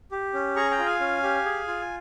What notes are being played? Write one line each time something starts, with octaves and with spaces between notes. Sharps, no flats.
G4
C#4
G#4 A#5 C#6
G5 A#5
F4
F5 G#5
C#4
G4
G#4
F4